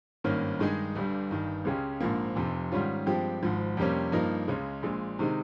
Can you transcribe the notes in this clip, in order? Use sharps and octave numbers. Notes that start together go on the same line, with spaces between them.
G#1 G2 D#3 A#3 C#4
G2 D#3 G#3 D#4 G#4
G1 G2 G3
G1 G2 D#3
C#2 C#3 G#3 C#4 G4
A#1 G#2 F3 A#3
F1 F2 C3
G#2 D#3 G3 C#4 F4
G2 F3 G#3 C4 G4
G#1 G#2 F3
F2 C3 G3 A#3 C#4
G2 F3 A#3 D#4 A#4
C#2 C#3 G#3
A#1 A#2 G#3
C3 D#3 G#3 D#4